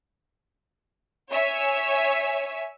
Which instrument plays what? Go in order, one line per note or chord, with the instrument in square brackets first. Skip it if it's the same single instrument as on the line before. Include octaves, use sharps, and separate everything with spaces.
[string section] C#5 E5 G#5